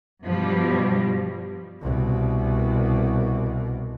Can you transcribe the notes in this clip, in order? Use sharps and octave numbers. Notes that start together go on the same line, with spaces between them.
G2 B2 F3 G3
C2 B2